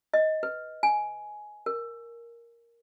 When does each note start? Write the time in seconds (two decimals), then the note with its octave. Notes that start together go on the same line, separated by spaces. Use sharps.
0.14 D#5
0.43 B4
0.83 G#5
1.66 A#4